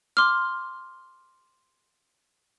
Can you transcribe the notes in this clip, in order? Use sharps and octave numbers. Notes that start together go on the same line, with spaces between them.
C6 D6 F6